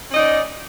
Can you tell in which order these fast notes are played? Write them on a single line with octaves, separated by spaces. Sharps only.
C#4 D#5 D#4 D5